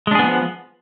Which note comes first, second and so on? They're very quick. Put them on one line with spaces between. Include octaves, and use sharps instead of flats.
G#3 D4 G#4 B3 F3